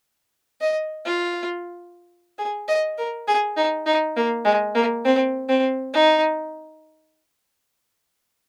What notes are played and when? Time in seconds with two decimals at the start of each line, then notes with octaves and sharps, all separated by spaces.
0.61 D#5
1.05 F4
2.39 G#4
2.68 D#5
2.98 A#4
3.28 G#4
3.57 D#4
3.86 D#4
4.17 A#3
4.45 G#3
4.75 A#3
5.05 C4
5.49 C4
5.94 D#4